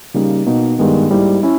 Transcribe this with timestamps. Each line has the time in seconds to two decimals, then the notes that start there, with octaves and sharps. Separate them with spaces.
0.14 C#3 G3 A#3 D#4
0.46 B2 A#3 D#4
0.79 G2 D#3 G#3 B3
1.11 G#2 G3 A#3 E4
1.43 C#4 E4